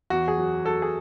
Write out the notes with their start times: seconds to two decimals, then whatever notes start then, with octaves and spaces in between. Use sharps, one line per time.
0.10 E2 F#4
0.28 G#4
0.37 F#3
0.65 F#3 A4
0.82 G#4